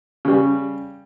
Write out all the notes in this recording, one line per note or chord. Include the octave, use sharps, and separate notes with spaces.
C#3 G3